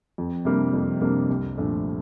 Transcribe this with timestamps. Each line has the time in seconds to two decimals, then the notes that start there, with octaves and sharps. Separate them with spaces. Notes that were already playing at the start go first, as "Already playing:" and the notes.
0.18 F2
0.45 C3 G3 A#3 D4
0.73 F2
1.01 C3 G3 A#3 D4
1.30 C2
1.58 A#2 F3 A3 D4